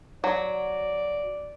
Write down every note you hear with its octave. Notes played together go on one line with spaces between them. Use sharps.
F#3 D5